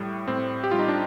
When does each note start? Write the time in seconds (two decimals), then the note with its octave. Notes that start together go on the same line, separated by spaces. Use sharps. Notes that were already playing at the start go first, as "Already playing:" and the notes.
Already playing: A2 G3
0.28 A2 C4
0.64 G4
0.71 G3 F4
0.79 D#4
0.88 D4